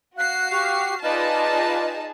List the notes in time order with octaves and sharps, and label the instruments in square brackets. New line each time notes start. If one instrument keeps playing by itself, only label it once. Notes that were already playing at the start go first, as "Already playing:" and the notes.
[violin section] F#4 C7 [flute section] F5 F#6
[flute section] G4 C#6 F#6 [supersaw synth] F5
[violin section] D#4 G#4 A5 [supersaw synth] F4 B4 D5 [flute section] D#5